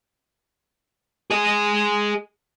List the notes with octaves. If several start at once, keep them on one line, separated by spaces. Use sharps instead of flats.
G#4 D#5